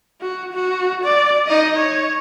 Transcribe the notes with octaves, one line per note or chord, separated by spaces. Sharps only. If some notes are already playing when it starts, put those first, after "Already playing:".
F#4
F#4
D5
D#4 D#5
C#5